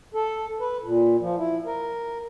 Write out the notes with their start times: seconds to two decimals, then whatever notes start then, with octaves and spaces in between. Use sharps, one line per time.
0.14 A4
0.60 B4
0.84 A#2
1.21 F3
1.37 E4
1.66 A#4